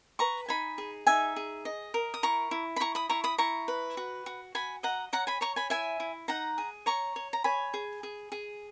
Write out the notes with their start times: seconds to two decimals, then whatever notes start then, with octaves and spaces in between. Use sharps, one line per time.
0.19 B4 A#5 C#6
0.48 D#4 G#5 B5
0.78 G#4
1.07 D#4 E5 G#5
1.36 G#4
1.65 D#5
1.94 A#4
2.14 D#6
2.23 E4 A#5 C#6
2.51 E4
2.76 B5
2.80 E4 A#5 C#6
2.95 B5 D#6
3.09 E4 A#5 C#6
3.24 B5 D#6
3.38 E4 A#5 C#6
3.68 B4
3.97 F#4
4.26 F#4
4.55 F#4 G#5 B5
4.83 D#5 F#5 A#5
5.13 C#5 F#5 A#5
5.27 G#5 B5
5.41 C#5 A#5 C#6
5.56 G#5 B5
5.70 E4 E5 G#5
6.00 E4
6.28 D#4 F#5 A#5
6.58 G#4
6.86 C#5 A#5 C#6
7.16 C#5
7.33 A#5
7.44 C#5 G#5 B5
7.74 G#4
8.03 G#4
8.32 G#4